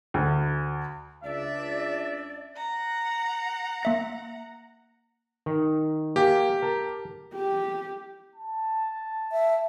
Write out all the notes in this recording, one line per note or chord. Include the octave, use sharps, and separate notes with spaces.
D2
C#2 D4 D5 E5
F#5 A#5
A#3 E5 A#6
D#3
A#3 G4 F5 G#5
A#4 A5
G4
A5
E5